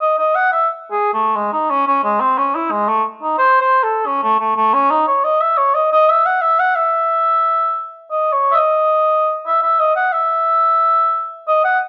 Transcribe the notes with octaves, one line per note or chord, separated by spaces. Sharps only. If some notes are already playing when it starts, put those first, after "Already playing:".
D#5
D#5
F#5
E5
G#4
A3
G#3
D#4
C#4
C#4
G#3
C4
C#4
E4
G#3
A3
D#4
C5
C5
A4
C#4
A3
A3
A3
C#4
D#4
C#5
D#5
E5
C#5
D#5
D#5
E5
F#5
E5
F#5
E5
D#5
C#5
E5
D#5
E5
E5
D#5
F#5
E5
D#5
F#5